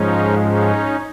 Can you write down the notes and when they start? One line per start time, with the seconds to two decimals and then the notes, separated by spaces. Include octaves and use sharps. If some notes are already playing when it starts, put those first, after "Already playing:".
Already playing: G#2 F3 G#3 C#4 D#4
0.38 C#4 D#4